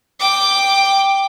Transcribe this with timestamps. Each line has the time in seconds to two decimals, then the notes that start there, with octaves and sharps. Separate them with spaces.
0.20 G5 D6